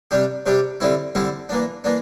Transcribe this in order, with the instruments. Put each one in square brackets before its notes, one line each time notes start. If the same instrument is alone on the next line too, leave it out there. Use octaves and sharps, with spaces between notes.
[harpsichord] C3 G3 D4 G4
C3 G3 D4 G4
D3 G3 C4 E4
D3 G3 C4 E4
E3 A#3 D4
E3 A#3 D4